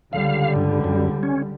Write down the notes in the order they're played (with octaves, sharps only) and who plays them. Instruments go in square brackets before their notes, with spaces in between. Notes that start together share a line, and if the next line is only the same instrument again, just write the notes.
[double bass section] C#2 D3 G3 [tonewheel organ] F5
[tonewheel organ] G2
F#2
C#4